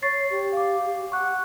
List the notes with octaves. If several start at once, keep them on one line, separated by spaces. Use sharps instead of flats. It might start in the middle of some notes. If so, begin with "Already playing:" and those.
C#5 C#6 A6 C7
G4
F5 D6
F#5 C#6 F#6